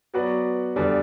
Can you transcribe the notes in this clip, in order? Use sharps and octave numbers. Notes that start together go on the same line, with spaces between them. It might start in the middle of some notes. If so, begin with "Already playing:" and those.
F#3 B3 F#4 B4 D5
E2 D3 G3